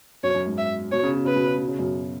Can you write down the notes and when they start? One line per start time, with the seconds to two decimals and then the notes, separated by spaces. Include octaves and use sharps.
0.23 F#2 B2 C#5
0.35 F#2
0.46 G#2
0.58 E5
0.92 B2 C#5
1.03 C#3
1.14 B2
1.25 C#3 B4
1.36 B2
1.47 C#3
1.58 B2
1.68 C#3
1.79 F#2 B2